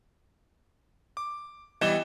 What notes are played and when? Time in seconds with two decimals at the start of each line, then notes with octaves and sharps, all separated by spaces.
1.17 D6
1.81 E3 G3 B3 D#5 E7 G7